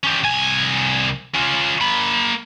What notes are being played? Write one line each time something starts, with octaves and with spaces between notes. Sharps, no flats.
C#4 G4
C2 G#5
C#4 F4
A#3 B5